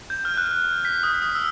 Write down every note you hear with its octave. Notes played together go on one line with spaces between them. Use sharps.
G6
F6
F#6
B6
D#6
D#6
E6